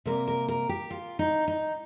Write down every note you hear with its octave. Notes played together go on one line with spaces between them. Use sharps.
C3 G3 A#3 A#4
A#4
A#4
G4
F4
D#4
D#4